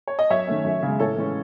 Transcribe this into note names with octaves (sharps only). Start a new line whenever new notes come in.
C#5
D#5
F#2 C#5 E5
D#3 A3 C#4
F#2
C#3 G#3
A2 A4 C#5
E3 G#3 C#4